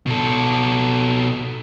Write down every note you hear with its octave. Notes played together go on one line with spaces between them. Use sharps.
B2 A4